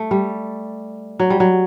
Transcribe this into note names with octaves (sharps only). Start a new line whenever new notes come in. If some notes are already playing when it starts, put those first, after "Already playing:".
Already playing: A3
G3
F#3
G3
F#3